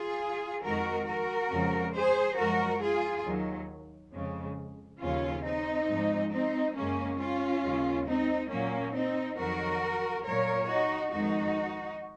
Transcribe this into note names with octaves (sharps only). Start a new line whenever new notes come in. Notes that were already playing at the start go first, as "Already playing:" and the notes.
Already playing: F4 G#4
F2 D#3 G#3 F#4 A#4
F#4 A#4
F2 C#3 F3 G#3
G#4 C5
F#2 F3 G#3 F#4 A#4
F4 G#4
D#2 D#3 F#3
F2 C#3 G#3
D#2 C#3 F3 C#4 F4
C4 D#4
G#2 F3 G#3
C4 D#4
F#2 C#3 G#3 A#3 C#4
C#4 F4
D#2 C#3 G#3
C4 D#4
A#2 F#3 A#3 C#4
C4 D#4
F2 D#3 F#3 F#4 A#4
A#2 F#3 A#4 C#5
D#4 F#4
F2 D#3 G#3 D#4 F#4